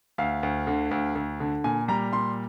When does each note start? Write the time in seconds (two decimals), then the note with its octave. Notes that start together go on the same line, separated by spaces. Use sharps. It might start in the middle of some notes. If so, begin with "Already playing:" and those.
0.18 D2 F5
0.43 D2
0.67 D3
0.91 D2
1.15 D2
1.40 D3
1.64 A#2 G#5
1.88 G3 A#5
2.13 A#2 C6